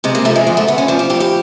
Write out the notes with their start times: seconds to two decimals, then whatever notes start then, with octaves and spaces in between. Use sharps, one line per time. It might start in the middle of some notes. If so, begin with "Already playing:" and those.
0.04 C3 G#3
0.15 A#3
0.25 F3 A3
0.36 G#3
0.47 D2 G#3
0.57 A3
0.67 D2 B3
0.78 C#4
0.88 F3 D4
0.99 G4
1.10 A2 G4
1.20 G4